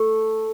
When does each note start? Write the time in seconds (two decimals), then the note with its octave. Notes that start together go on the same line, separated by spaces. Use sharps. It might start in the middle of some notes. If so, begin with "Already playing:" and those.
Already playing: A3